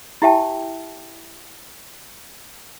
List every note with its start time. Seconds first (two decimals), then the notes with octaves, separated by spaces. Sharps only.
0.22 E4 G4 E5 G5 A5